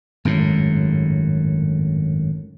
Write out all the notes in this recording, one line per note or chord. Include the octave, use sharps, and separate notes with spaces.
G#1 F#2 A2